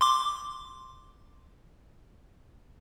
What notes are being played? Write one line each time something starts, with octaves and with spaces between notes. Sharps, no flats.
C6 D6